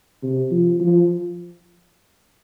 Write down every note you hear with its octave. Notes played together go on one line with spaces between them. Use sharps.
C3
F3
F3